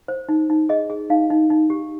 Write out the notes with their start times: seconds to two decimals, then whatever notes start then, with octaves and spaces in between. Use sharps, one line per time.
0.08 C5
0.29 D#4
0.50 D#4
0.69 G#4 D#5
0.90 G#4
1.10 D#4 F5
1.30 D#4
1.50 D#4
1.70 G4